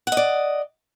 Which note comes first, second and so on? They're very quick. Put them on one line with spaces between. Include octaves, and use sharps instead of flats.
F#5 D#5 D5